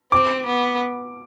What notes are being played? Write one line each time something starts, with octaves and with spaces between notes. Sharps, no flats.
C4 D6
B3